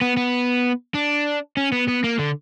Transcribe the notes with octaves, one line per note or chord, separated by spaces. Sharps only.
B3
B3
D4
C#4
B3
B3
A#3
D3